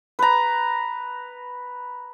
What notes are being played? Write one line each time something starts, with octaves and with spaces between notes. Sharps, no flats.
B4 A#5